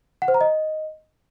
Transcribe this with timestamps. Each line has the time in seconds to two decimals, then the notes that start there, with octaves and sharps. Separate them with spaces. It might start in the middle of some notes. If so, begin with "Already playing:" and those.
0.22 F#5
0.28 C5
0.34 A#5
0.41 D#5